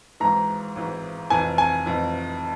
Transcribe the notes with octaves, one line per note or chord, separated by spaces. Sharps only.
G#1 G#2 E3 A#5
G#1 G#2 E3
F1 F2 E3 G#5
G#5
F1 F2 E3